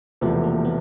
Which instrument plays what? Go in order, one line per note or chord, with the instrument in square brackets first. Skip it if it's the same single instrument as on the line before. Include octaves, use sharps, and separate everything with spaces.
[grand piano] E1 E2 C3 F3 A3 [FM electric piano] B3
[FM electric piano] A#3
B3